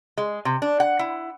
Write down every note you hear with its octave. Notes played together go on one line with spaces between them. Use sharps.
G#3
C3
D4
F#5
E4